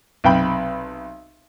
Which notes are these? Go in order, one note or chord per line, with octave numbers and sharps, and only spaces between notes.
B1 C3 G5 B5